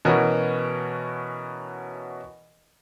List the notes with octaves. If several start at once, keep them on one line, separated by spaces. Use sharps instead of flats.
B2 E3 C#4 F#4 A#4